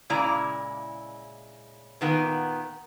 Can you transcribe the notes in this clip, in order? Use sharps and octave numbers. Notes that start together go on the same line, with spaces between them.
A#2 C#3 G#3 E4 D5 A#5
A#2 D#3 B3